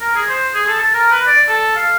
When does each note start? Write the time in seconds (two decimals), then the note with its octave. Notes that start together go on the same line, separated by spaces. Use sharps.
0.01 A#4
0.16 G#4
0.29 C5
0.54 G#4
0.68 A4
0.80 A5
0.94 A#4
1.11 B4
1.27 D5
1.49 A4
1.76 F5